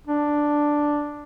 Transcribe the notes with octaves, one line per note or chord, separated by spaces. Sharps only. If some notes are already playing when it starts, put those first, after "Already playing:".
D4